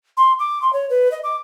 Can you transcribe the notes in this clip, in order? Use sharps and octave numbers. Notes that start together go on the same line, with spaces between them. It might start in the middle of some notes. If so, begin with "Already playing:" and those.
C6
D6
C6
C#5
B4
D#5
D6